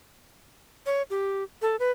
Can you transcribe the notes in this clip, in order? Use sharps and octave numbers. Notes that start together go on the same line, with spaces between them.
C#5
G4
A4
B4